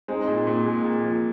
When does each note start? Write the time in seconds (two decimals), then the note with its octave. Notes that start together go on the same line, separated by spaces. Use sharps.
0.08 G#3 C4 D#4
0.28 A#2
0.47 A#2
0.66 G#3
0.85 A#2
1.04 F3